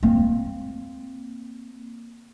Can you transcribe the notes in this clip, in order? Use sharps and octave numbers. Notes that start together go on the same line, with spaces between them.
A#3 C4